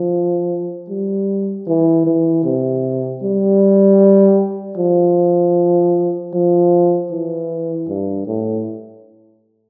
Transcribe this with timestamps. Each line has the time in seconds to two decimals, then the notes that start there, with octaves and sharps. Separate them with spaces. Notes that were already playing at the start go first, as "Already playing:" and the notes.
Already playing: F3
0.89 G3
1.67 E3
2.06 E3
2.44 C3
3.23 G3
4.77 F3
6.34 F3
7.11 E3
7.88 G2
8.27 A2